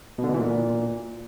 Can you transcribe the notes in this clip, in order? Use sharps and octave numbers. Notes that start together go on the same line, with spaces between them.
B2
D3
B2
E3
A#2